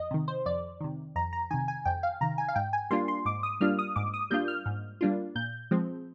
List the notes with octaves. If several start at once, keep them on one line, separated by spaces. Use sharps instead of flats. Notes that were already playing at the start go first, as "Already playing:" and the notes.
Already playing: F2 D#5
C3 D#3
C5
F2 D5
C3 D#3
F2 A#5
A#5
C3 D#3 G#5
G#5
F2 G5
F5
C3 D#3 A#5
G#5
F5
G#2 G5
G#5
G3 A#3 D4 F4 C6
C6
G#2 D6
D#6
G3 A#3 D4 F4 F6
D#6
G#2 D6
D#6
G3 A#3 D4 F4 G6
F6
G#2
G3 A#3 D4 F4
A#2 G6
F3 G#3 C4